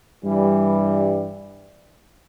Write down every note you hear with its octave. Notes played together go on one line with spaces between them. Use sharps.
G2 E3 G3